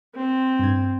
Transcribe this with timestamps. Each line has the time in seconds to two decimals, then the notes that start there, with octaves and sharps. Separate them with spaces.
0.15 C4
0.59 G2 G#6